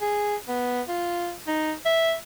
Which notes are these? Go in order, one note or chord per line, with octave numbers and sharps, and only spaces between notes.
G#4
B3
F4
D#4
E5